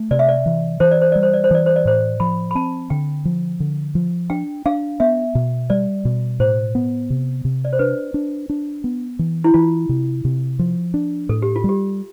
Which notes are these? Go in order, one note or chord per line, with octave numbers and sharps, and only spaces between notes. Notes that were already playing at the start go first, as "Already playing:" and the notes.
Already playing: A3
C3 D5
E5
D5
E3
E3 C5
D5
C5
G3 D5
C5
D5
C5
E3 D5
C5
D5
A2 C5
F3 B5
B5
C4 A5
D3 G5
F3
D3
F3
D4 G5
D4 F5
B3 E5
B2
G3 D5
B2
A2 C5
B3
C3
C3
D5
C5
D4 B4
D4
D4
B3
E3
E4
E3 F4
C3
C3
F3
D4
A2 A4
G4
F4
G3 G4